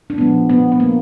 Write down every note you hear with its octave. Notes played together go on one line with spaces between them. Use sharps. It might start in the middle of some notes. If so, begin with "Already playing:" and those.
D4
A#2 F3 G#3 B3
B3
B3
A#3